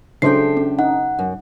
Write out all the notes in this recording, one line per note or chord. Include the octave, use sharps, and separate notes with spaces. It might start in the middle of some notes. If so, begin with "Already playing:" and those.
C#3 F#3 D4 A4 C5 E5 G5 C7
C#4
D#4 F#5
F#2